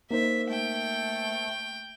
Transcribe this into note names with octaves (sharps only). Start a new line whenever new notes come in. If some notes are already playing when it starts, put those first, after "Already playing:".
A#3 D#4 C5 E5
A3 G5